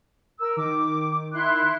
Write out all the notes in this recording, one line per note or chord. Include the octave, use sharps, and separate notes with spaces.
A#4 E6
D#3 D6
E4 C6 F#6